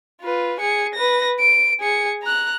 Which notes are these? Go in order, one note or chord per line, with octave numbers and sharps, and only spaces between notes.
F4 B4
G#4 C#7
B4 A#6
D7
G#4 C#7
A#5 F#6